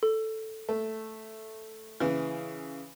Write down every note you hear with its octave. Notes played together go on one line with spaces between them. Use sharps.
A4
A3
C#3 E3